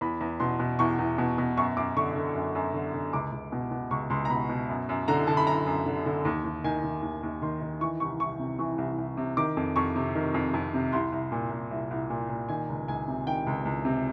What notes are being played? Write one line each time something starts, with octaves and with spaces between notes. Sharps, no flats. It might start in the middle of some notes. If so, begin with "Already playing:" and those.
E2 B5
E2
B2 C6
B2
E2 C#6
E2
B2
B2
F#2 C#6
F#2 D6
D3 C#6
D3
F#2
F#2
D3
D3
C#2 D6
C#2
B2
B2
C#2 C#6
C#2 C6
A#5
B2 B5
B2
F#2
F#2
D3 A#5
D3 A5
B5
F#2 A#5
F#2
D3
D3
D#2
D#2
D#3 G#5
D#3
D#2
D#2
D#3 C6
D#3
E3 C#6
C2 C#6
C2 C#6
C3
E3 C#6
C2
C2
C3
D#3 D6
F2
F2 C#6
C3
D#3
F2
F2
C3
C2 C6
C2
A#2
A#2
C2
C2
A#2
A#2
D#3 G#5
C#2
C#2 G#5
C3
D#3 G5
C#2
C#2
C3